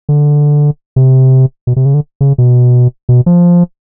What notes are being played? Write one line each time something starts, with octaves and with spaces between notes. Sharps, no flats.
D3
C3
B2
C3
C#3
D3
C#3
B2
B2
F3